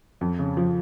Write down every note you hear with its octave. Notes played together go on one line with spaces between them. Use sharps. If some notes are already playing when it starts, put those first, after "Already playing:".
F2
C#3
F3